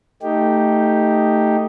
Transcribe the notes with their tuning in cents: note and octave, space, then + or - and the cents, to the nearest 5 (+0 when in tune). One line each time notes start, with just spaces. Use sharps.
A3 +20 D#4 +0 G4 +0